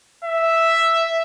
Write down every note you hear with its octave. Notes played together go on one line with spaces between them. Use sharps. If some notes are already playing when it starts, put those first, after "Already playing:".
E5